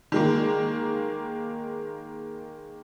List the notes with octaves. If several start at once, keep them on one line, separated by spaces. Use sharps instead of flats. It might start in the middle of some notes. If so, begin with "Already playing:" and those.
D#3 G#3 A#3